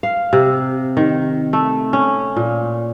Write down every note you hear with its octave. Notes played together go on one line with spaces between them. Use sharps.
F5
C3
D#3
A3
C#4
A#2